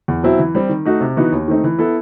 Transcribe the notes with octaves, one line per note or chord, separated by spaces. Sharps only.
E2
B2 F#3 C4 E4
E3
G3 C4
D#3
A3 D#4 F#4
C3
E3 B3 D#4 F#4
D#2
D#3 A3 C4 D#4
E3
B3 E4 A4